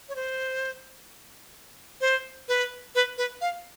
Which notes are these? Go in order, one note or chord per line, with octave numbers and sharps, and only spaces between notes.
C#5
C5
C5
B4
B4
B4
F5